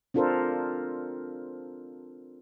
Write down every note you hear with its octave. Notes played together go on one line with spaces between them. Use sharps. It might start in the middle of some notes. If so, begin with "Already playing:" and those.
C4 D4 F4 A4 A#4 C5